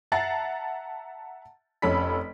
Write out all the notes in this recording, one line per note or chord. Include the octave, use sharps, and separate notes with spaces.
E5 F#5 A5 A#5 A6 C7
F1 F2 C#4 A4 B5 B6